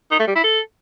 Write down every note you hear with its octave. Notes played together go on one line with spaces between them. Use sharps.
D#4
A3
G3
E4
A4